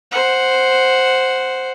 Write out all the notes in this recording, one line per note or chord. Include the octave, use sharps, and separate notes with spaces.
C5 F#5